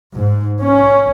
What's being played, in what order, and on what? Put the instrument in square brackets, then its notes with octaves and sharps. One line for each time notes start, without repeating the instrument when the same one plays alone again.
[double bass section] G#2
C#4